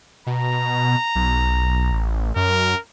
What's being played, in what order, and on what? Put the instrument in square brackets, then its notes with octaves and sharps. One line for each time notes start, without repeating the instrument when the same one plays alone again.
[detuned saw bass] B2 [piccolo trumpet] A#5
[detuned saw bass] B1
A1
[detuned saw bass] F#2 [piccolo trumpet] A#4